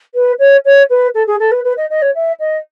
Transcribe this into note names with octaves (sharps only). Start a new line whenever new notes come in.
B4
C#5
C#5
B4
A4
G#4
A4
B4
B4
D#5
D#5
C#5
E5
D#5